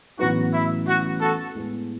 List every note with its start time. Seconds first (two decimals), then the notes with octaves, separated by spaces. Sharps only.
0.18 A1 A2 F#3 B3 D#4 F#4
0.53 E4
0.87 F#4
1.21 F#4 A4
1.55 A2 G#3 B3